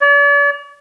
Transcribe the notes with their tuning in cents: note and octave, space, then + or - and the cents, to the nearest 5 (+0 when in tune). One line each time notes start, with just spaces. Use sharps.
D5 -45